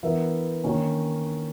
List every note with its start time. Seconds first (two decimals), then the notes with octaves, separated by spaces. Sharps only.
0.03 E3 B3 E4 A#4 E5
0.64 D#3 A#3 C#4